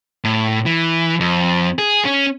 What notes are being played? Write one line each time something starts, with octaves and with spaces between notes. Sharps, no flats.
A2
E3
F2
G#4
C#4